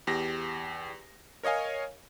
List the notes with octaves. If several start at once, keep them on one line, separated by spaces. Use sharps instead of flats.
E2 G4 A#6
A#4 C#5 D#5 F5 G#5